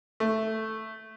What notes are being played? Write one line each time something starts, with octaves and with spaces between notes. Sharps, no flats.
A3